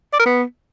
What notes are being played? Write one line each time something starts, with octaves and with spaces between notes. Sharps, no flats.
D5
A#4
B3